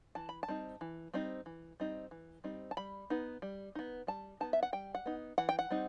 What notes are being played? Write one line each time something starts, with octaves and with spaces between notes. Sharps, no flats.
E3 A5
B5
A5
G3 C4 D#4
E3
G3 C4 D#4
E3
G3 C4 D#4
E3
G3 C4 D#4
A5
G3 B5
B3 D#4
G3
B3 D#4
G3 A5
B3 D#4 A5
E5
F#5
G3 G5
F#5
B3 D#4
E3 F#5
G5
F#5
G3 C4 D#4